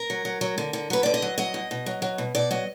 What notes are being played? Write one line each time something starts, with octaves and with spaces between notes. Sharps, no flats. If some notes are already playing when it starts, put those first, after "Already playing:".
Already playing: A#4
F#3
F#3
F#3
D3
D3
F#3 B4
D3 D5
D#5
F#3
F#3 D#5
B2
B2
F#3
F#3
B2
B2 D5
F#3 D#5